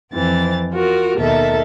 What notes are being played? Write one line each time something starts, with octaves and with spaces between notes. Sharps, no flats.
F2 E3 C4 A6
F4 F#4 A#4
D#2 B2 A4 A#4 E5 A6